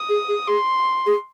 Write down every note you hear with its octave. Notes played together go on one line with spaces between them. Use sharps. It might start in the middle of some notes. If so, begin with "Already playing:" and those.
Already playing: D#6
G#4
G#4
G#4 C6
G#4